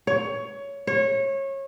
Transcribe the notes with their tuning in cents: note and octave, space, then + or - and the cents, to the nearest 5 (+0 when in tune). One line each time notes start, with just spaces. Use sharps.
C#5 +15
C#5 -25